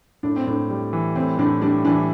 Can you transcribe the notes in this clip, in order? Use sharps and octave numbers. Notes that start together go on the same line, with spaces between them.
A2 D4
C4
A2 D4
G3
E3
A2 C4
A2 D4
G3 D4
E3 D4